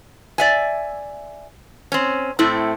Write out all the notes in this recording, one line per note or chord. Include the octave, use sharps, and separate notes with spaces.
D5 E5 G#5
C4 C#4
A2 A3 C4 E4